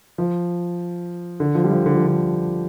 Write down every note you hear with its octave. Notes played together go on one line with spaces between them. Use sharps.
F3
D3
F3
G3
F3
D3
F3
D3